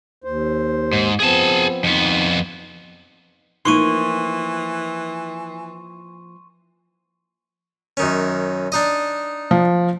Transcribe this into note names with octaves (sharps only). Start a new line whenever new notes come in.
D#2 C5
G#2
F3 B3 C4 G#4 A5
F2 B3 D#4
E3 F3 A#3 D#4 C6 C#6 D#7
F#2 D#3 C#4
D4 D#4 D#5
F3